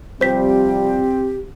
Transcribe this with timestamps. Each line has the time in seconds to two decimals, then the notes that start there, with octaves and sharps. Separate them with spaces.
0.21 C3 F3 G3 C4 G4 C5 B6